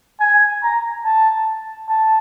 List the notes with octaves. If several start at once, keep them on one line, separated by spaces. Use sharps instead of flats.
G#5
A#5
A5
A5